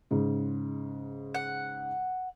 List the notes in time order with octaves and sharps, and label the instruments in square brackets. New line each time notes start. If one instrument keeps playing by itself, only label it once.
[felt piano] G#2 C#3
[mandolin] F#5